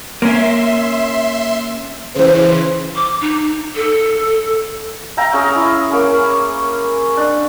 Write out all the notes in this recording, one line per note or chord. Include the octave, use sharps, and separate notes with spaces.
A#3 C#4 E5 C6
C#3 E3 C5
D6
D#4
A4
E5 F5 G5 A#5
C#4 G#4
E4
A#3 C#4
D4